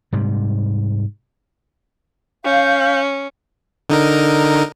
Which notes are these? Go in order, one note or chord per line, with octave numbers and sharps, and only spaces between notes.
G#2 C3 G3
C#4 F5 G6
D3 D#4 A#4